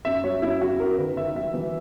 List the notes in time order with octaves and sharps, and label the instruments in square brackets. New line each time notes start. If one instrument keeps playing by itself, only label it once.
[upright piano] F#2 E5
F#3 C#5
F#2 E4
F#2 F#4
F#2 A#4
D#3 B4
D#3 E5
F#3 E5
E3